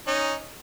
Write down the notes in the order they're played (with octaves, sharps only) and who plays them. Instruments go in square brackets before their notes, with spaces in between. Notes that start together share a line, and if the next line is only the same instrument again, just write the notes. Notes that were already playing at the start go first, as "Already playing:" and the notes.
[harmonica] C#4 D#4